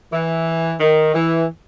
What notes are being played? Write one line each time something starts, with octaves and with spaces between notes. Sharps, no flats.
E3
D#3
E3